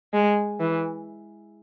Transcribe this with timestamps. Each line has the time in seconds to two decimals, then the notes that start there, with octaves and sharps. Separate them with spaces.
0.13 G#3
0.60 E3